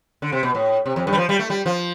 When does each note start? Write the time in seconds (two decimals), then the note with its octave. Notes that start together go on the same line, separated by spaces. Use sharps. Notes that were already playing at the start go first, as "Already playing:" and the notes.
0.22 D3
0.32 C3
0.43 B2
0.55 A2
0.86 C3
0.96 F2
1.07 G2
1.13 G3
1.18 F3
1.29 G3
1.39 A3
1.50 G3
1.66 F3